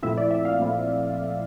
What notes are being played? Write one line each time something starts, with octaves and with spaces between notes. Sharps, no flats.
A#2 F3 A3 C4 E4 E5
D5
E5
F5
A#2 F3 A3 C4 E4